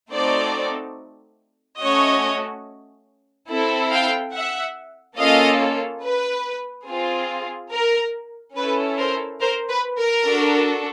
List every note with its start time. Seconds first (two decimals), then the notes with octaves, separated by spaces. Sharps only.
0.12 A3 C4 D#4 F#4 A4 C5 D5
1.81 A3 C#4 F#4 C#5 D#5
3.49 C4 E4 A4
3.92 F5 G5
4.34 E5 F#5
5.18 A#3 C#4 F4 A4 D#5 F5
6.03 B4
6.87 C4 F4 G#4
7.72 A#4
8.56 C#4 E4 A4 B4
8.99 A#4 C5
9.40 A#4 C5
9.69 B4
9.98 A#4
10.25 D4 F#4 A4